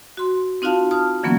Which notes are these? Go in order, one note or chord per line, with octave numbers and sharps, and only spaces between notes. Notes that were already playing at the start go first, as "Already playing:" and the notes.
F#4 C6
C4 D#4 F4 F#4 F5 A5
A5 D#6 F6
D3 E3 F#3 A#3 B3 C#4